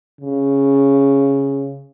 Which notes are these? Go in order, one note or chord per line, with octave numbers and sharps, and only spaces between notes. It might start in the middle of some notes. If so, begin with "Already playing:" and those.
C#3